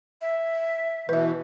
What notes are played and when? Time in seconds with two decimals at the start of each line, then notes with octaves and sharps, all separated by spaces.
0.21 E5
1.09 B2 E3 B4 E5